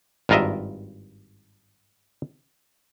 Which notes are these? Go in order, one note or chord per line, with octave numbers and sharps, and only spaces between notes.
G#1 G2 F4 A#4 D#5 E5